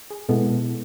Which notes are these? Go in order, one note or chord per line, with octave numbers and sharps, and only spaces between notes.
G#4
B2 G#3 B3 E4 A4